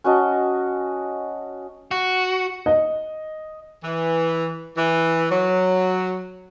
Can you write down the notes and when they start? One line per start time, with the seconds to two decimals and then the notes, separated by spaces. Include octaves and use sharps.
0.04 C#4 F#4 D#5 A5
1.91 F#4
2.66 D#5
3.83 E3
4.77 E3
5.30 F#3